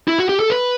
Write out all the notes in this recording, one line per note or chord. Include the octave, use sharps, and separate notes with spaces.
E4
F#4
G4
A4
B4